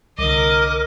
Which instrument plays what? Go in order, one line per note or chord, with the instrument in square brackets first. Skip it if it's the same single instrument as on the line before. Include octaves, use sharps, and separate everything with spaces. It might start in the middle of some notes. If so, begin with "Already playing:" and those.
[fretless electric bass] C2 D3 [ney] A#4 [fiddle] D#5 [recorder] D6